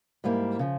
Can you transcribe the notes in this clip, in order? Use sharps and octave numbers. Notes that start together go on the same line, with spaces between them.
G#2 G3 A#3 E4
C#3 F3